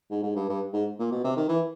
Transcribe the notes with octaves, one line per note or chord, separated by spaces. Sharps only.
G#2
G#2
G2
G2
G#2
A#2
B2
C3
D#3
E3